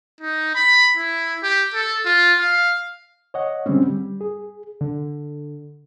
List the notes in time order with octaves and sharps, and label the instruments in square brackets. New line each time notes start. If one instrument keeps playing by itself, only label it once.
[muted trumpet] D#4
B5
E4
G4
A4
F4
F5
[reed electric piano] C#5 D#5 F#5
D3 G3 G#3 C4 C#4
G3
G#4
[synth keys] D3